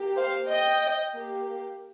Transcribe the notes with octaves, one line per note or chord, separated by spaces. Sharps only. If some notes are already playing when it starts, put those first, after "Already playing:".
Already playing: A#3 G4
C5 F5
D#5 G5
A#3 G4